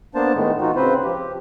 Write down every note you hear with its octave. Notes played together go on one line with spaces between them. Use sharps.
A#3 B3 D4 C5 A5
A2 D#3 G#3 A3 B3
E3 D#4 F4 F#4
C#3 C4 B4 C5
F3 G4